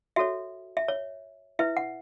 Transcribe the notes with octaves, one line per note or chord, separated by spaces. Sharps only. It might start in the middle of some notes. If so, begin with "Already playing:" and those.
F#4 A4 C#5 E5
E5
C#5
E4 B4 E5
F#5